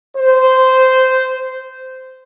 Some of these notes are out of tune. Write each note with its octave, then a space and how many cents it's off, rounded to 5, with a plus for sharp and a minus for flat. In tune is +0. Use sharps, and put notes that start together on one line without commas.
C5 -10